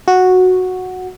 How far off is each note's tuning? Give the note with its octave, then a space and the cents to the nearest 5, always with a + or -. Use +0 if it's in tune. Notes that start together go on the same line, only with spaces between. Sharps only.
F#4 -5